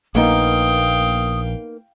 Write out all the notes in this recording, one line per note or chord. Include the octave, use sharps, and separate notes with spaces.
A#1 A#3 B3 D#4 F5 G5 D#6